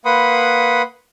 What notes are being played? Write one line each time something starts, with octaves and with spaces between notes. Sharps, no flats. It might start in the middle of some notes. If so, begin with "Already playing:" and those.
A#3 B4 F#5 B5 C6 D#6